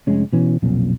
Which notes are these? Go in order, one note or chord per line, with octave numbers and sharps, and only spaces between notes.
F1 G#3 C#4
B2 E3 C#4
B1 F2 A#2 C#3